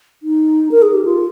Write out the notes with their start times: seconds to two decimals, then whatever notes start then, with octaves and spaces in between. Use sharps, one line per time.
0.23 D#4
0.71 A#4
0.82 G#4
0.93 G4
1.05 F4